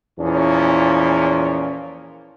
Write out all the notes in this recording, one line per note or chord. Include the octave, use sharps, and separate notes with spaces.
E2 A#2 F3 C#4